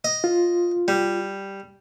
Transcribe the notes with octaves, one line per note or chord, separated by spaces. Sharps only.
D#5
F4
G3